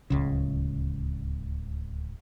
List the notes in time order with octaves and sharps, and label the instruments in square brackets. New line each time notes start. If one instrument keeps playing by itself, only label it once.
[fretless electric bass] D1 C#2 C#3